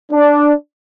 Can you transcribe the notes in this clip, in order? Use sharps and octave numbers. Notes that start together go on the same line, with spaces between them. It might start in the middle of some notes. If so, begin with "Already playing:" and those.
D4